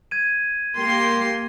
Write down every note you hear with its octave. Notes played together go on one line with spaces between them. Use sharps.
G#6 D#7
A#3 G4 C6